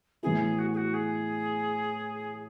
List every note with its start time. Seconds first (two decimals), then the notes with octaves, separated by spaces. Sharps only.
0.23 A2 E3 B3 E4 G#4
0.59 F#4
0.73 G#4
0.77 F#4
0.94 G#4